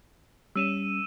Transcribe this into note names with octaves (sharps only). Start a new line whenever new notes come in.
G3 C#4 E6 D#7 E7